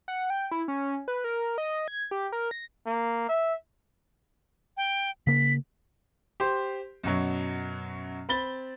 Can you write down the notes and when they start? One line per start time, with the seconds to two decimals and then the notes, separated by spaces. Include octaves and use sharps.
0.08 F#5
0.30 G5
0.51 E4
0.68 C#4
1.08 B4
1.24 A#4
1.58 D#5
1.88 G#6
2.11 G4
2.32 A#4
2.51 A#6
2.86 A#3
3.29 E5
4.77 G5
5.27 C#3 A#3 B6
6.40 G4 C5 C6
7.04 F#2 B2 F#3
8.29 C4 B5 A6 G7